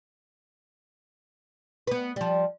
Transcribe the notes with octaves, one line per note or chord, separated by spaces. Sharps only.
B3 B4
F3 G3